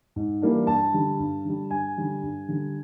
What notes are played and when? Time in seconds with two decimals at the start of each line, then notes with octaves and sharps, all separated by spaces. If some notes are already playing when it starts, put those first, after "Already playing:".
0.16 G#2
0.42 E3 G3 A#3 D4
0.67 G2 A5
0.94 D3 G3
1.19 G2
1.45 D3 G3
1.70 G2 G#5
1.97 D3 G3
2.23 G2
2.48 D3 G3